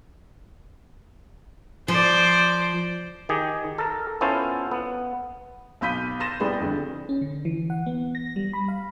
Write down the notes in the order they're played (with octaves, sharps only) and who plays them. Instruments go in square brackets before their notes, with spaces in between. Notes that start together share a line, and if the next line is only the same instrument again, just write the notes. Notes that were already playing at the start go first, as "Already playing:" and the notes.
[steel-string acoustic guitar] F3 [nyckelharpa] C5 D5
[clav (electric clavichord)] D#3 G4 G#4
A4 A#4
B3 C#4 E4 F4 A4 C5
B3
[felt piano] B1 F5 B5 G6 B6 D#7
C6 G6 A6 A#6 E7
C2 G3 B3 G#4 B5 G6
F2 D3
[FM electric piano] C#4
D3
E3
F#5
B3
A#6
G3
B5
F5